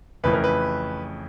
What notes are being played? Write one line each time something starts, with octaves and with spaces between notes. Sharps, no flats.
F2 C#3 E3 A3 B4
A#4
B4